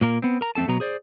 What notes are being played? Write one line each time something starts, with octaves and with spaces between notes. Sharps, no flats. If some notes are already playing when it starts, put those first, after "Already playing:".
A#2 A#3 A#4
B3 C4
A#4 A#5
F2 A3 C4 A4 A5
B2 F#3 B3 A#5
G#4 C5 D5